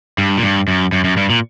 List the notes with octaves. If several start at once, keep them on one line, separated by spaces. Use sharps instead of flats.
G2
A#2
G2
F#2
F#2
F#2
G2
A#2